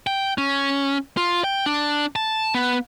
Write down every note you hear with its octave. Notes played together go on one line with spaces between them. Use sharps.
G5
C#4
F4
G5
D4
A5
B3